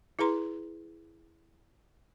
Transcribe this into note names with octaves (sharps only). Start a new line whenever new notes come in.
E4 G#4 B4 A#5 C6